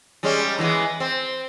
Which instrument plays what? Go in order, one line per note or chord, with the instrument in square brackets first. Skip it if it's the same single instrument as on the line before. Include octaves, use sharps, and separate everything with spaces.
[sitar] G3 G#3 C#4
E3 G#3 B3
C4